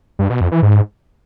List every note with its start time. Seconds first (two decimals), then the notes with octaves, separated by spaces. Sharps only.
0.19 G2
0.30 B2
0.41 F2
0.52 E3
0.63 G#2